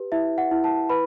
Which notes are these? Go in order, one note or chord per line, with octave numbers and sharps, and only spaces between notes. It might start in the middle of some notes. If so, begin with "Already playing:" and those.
Already playing: G4 B4
E4 E5
F#5
E4
A5
B4 B5